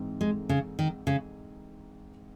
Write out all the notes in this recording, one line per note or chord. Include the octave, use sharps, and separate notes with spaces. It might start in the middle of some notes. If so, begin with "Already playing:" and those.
Already playing: G#2 E3 C4 D#4
G#3
C#3
D#3
C#3